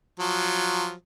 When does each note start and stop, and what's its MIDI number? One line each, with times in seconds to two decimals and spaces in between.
0.19 0.93 53
0.19 0.93 54